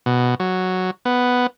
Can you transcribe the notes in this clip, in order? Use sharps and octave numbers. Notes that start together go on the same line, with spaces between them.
B2
F#3
B3